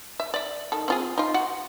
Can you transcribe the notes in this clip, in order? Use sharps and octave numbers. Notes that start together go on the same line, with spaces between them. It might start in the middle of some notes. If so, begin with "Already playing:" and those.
E5
D5 E5
D#3 A4
C4 F4 G#4
D#4 F4
F#4